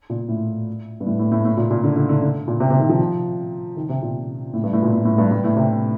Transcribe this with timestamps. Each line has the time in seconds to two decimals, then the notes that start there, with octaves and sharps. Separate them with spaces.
0.10 A#2
0.28 A2
1.00 G2
1.06 A2
1.19 A2
1.32 A2
1.45 A2
1.57 A#2
1.71 A#2
1.84 D3
1.96 D3
2.09 D3
2.22 D3
2.48 A#2
2.60 C3
2.70 C3
2.79 D#3
2.89 F3
3.76 D#3
3.89 C3
4.02 A#2
4.54 A2
4.63 G2
4.73 A2
4.83 A#2
4.92 A2
5.05 A2
5.18 G2
5.31 G2
5.44 A2
5.56 C3